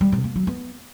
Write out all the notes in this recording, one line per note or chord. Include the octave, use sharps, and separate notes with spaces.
G3
C3
A#3
F#3
B3